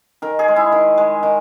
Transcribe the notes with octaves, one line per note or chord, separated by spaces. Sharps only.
D#3 A#4
G#4
G#3
E4
D#3
G#3
D#3